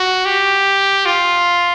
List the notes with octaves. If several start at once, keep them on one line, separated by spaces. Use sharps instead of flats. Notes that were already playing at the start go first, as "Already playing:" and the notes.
Already playing: F#4
G4
F4